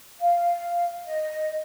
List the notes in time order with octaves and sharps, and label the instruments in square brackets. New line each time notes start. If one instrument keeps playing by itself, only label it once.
[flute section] F5
D#5